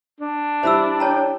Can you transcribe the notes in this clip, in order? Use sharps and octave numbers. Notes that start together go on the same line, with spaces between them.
D4
G3 E4 C5 E5 B5 E6
C#5 G5 A5 A#5